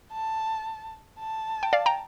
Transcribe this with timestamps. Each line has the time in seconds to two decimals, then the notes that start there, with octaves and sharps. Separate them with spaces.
0.12 A5
1.19 A5
1.63 G5
1.73 D5 F5
1.86 G5 A#5